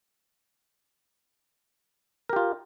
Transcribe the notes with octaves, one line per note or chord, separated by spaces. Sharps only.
F4 G4 A#4